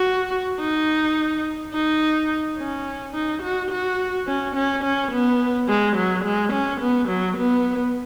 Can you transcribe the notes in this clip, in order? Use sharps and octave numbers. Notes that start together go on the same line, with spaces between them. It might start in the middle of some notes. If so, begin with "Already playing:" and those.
Already playing: F#4
D#4
D#4
C#4
D#4
F#4
F#4
C#4
C#4
C#4
B3
G#3
F#3
G#3
C#4
B3
F#3
B3